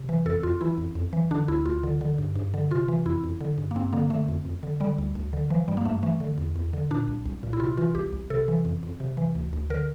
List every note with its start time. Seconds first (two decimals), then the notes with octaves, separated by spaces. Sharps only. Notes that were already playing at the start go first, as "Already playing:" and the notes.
Already playing: C3
0.09 E3
0.26 F2 A4
0.43 F2 F4
0.61 E3 E4
0.78 F2
0.95 F2
1.13 E3
1.31 D3 D4
1.48 D2 E4
1.66 D2 F4
1.83 D3
2.01 D3
2.18 G2
2.36 G2
2.54 D3
2.71 C3 F4
2.88 E3
3.06 F2 E4
3.24 F2
3.41 D3
3.58 G2
3.71 A#3
3.76 G2 C4
3.93 D3 A#3
4.10 D3 A3
4.28 F2
4.45 F2
4.63 D3
4.80 D3 G3
4.98 D2
5.15 D2
5.33 D3
5.50 E3 F3
5.68 G2 G3
5.77 A#3
5.85 G2 A3
6.03 E3 A3
6.20 D3
6.38 E2
6.56 E2
6.73 D3
6.91 A#2 D4
7.08 C2
7.26 C2
7.43 A#2
7.53 E4
7.60 C3 F4
7.77 E3 F4
7.95 C2 G4
8.13 C2
8.30 C3 A4
8.48 E3
8.65 F2
8.83 F2
9.00 C3
9.17 E3
9.35 D2
9.53 D2
9.70 D3 A#4